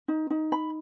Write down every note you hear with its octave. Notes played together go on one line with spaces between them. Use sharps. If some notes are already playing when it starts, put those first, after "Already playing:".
D#4
D#4
B5